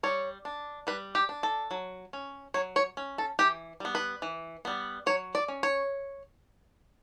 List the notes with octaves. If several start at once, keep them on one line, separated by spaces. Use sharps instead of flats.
G3 C#5
D4
G3 B4
G4
D4
A4
F#3
C#4
F#3 C#5
C#5
C#4
A4
E3 G4
G3 B3
B4
E3
G3 B3
F#3 C#5
D5
C#4
C#5